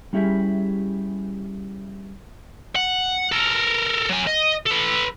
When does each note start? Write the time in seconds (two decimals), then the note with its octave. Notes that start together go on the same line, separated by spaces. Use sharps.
0.13 G3 C#4 E4 G4 G#4 E5
2.76 F#5
3.32 A4 A#4
4.09 F#3 G#5
4.27 D#5
4.67 A4 B4